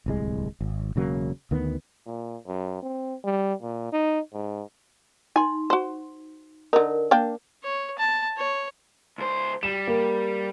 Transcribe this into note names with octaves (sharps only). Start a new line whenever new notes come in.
D1 C2 G#3
G#1
E1 C#3 F#3 A#3
D2 D#3 B3
A#2
F#2
C4
G3
A#2
D#4
G#2
D#4 G#5 C6
F#4 C5
D3 D#4 A#4
A#3 D4 G5
C#5
A5
C#5
C#2 C5
G3 E7
A#3